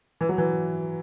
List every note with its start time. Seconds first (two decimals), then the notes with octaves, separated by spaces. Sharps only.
0.21 E3
0.29 F#3
0.38 E3